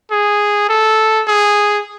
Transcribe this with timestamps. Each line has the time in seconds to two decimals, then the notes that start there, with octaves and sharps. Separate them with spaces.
0.12 G#4
0.69 A4
1.28 G#4